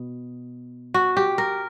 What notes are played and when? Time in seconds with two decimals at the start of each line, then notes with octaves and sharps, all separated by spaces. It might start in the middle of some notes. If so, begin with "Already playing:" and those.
Already playing: B2
0.94 F#4
1.17 G4
1.38 A#4